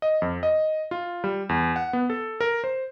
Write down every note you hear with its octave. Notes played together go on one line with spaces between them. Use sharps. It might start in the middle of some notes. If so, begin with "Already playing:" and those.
D#5
F2
D#5
F4
G3
E2
F#5
B3
A4
A#4
C5